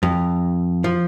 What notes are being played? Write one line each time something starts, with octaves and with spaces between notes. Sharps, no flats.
F2
F3